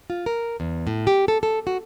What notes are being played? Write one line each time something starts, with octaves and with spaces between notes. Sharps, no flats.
F4
A#4
E2
A2
G4
A4
A4
F#4